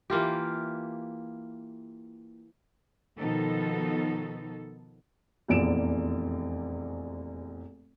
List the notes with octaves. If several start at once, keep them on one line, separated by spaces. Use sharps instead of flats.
E3 A#3 F4 G4
B2 D#3 F3 B3 D#4 A4
F1 A#1 E2 D5 D7 E7